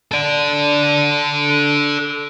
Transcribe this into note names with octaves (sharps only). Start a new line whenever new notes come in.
A4 D5